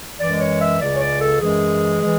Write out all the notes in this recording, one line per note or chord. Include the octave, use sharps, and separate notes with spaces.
F#2 E3 G#3 D5
C#5
E5
C#2 C#3 G#3 D5
C#5
D5
A4
F#2 E3 G#3 G#4
E3 G#3